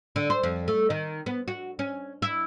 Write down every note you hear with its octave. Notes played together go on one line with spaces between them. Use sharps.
D3
C5
F2
A3
D#3
B3
F#4
C#4
E4